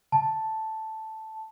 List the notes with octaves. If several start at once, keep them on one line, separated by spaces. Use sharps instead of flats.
A5